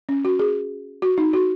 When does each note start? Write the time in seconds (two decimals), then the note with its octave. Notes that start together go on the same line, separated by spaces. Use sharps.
0.09 C#4
0.25 F#4
0.39 G#4
1.02 F#4
1.18 D#4
1.33 F#4